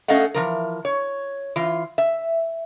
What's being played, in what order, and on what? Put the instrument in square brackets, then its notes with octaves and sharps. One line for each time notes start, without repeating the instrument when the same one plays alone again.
[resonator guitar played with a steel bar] A3 C#4 A4 D#5 F5 F#5
E3 F3 A#4
C#5
E3 F4
E5